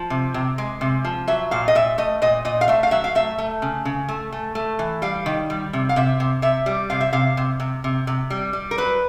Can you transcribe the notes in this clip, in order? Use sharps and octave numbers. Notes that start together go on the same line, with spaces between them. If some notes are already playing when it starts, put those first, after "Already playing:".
Already playing: F3
C3
C3
G#3
C3
F3
F#3 E5
A#2 F5
D#5
A#2 E5
A3 D#5
A#2 D#5
A#2 D#5
F5
A3 E5
F5
F#3 E5
F5
A3 E5
A3
C#3
C#3
A3
A3
A3
E3
G3 F5
D#3
G3
C3
F5
C3 E5
C3
C3 E5
G3
C3 F5
E5
C3 F5
C3
C3
C3
C3
G3
G3
A#4
F#3 B4